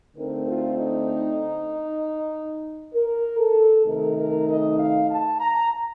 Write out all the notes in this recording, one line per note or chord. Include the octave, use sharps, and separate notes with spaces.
D3 A3 C4 D#4 A#4
F4
D#4
A#4
A4
C3 D#3 A3 D#4 A#4
A#4
D#5
F5
A5
A#5